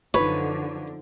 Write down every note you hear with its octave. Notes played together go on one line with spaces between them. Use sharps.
F#2 D3 F3 D#4 F4 B4 C#5